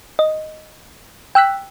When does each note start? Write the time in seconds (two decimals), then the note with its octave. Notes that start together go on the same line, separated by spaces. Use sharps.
0.19 D#5
1.35 G5 E6 F#6 B6